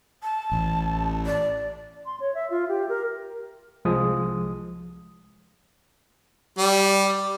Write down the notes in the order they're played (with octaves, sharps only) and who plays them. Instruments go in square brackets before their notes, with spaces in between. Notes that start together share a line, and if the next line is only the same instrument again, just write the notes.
[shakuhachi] A5
[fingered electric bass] A1
[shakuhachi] D5
[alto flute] C6
C#5
E5
F4
G4
A#4
[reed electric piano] C2 F3 G#3 D#6
[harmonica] G3